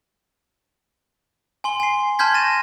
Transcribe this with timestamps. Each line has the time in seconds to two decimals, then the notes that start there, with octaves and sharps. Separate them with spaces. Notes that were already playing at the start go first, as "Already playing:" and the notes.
1.64 G#5 C6 G7
1.80 G#5 C7
2.19 A5 C6 F6 G6 G#6 B6
2.34 C#6 A6 A#6 D#7 E7